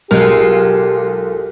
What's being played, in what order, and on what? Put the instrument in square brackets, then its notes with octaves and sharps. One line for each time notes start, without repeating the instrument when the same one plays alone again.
[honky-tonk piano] B1 F6 [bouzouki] G#3 F4 A4 [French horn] G4 [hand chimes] A#4